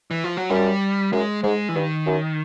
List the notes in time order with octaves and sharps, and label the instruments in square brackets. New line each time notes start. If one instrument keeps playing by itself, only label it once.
[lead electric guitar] E3
F3
F#3
[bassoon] F#2 [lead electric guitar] G3
[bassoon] F#2 [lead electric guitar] G#3
[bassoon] G#2 [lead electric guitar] G#3
[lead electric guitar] E3
[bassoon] G2 [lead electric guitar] D#3
[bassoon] F#2